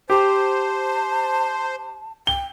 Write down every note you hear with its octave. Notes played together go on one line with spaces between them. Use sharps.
G4 C5 A5
G5 G7